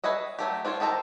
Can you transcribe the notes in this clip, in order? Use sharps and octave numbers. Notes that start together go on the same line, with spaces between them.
G#4 B4 C#5 D#5 E5
F#3 A3 G4
C4 D4 F4 C#5
D#3 G4 A4 C5 A#5